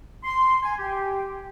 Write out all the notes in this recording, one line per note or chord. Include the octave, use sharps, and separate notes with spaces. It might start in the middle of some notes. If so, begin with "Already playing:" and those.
C6
G#5
G4